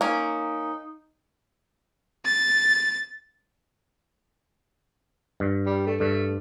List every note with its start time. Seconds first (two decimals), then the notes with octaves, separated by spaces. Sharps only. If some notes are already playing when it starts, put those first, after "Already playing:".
0.01 A#3 C#4 D#4
2.26 A6
5.40 G2
5.66 G3
5.86 A3
6.00 G2 A3